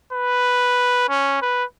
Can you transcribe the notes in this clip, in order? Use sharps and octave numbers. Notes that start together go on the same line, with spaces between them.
B4
C#4
B4